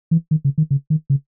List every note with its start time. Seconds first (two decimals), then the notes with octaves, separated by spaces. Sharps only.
0.11 E3
0.31 D#3
0.45 C#3
0.58 D#3
0.71 C#3
0.90 D#3
1.10 C#3